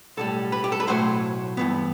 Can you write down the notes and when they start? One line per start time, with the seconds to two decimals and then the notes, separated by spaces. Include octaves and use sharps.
0.17 B1 A2 G3 A4
0.52 B4
0.64 G4
0.72 A4
0.80 B4
0.87 B1 A2 F#3 A3 C5
1.57 G2 E3 B3